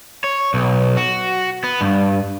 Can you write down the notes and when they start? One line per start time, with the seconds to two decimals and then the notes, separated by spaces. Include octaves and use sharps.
0.24 C#5
0.54 B1
0.97 F#4
1.64 B3
1.81 G2